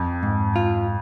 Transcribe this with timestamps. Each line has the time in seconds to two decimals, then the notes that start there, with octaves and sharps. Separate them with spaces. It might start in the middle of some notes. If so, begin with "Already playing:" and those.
Already playing: F2
0.23 G#2
0.56 F4